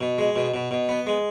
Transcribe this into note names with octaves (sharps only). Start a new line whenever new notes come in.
B2
G#3
B2
B2
B2
B3
G#3